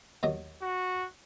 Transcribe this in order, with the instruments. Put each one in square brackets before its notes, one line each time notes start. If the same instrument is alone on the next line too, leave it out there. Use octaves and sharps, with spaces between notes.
[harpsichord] D#2 F#3 D#5
[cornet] F#4